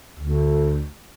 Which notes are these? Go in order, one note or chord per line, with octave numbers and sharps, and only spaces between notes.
D2